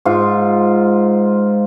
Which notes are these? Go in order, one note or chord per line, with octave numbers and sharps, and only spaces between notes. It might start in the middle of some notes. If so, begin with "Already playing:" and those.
G#2 F4